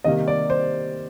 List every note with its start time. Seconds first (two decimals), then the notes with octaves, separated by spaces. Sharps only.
0.04 C3 D#3 G3 A#3 D#5
0.28 D5
0.50 C5